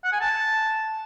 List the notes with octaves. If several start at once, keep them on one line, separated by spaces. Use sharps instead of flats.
F#5
G#5
A5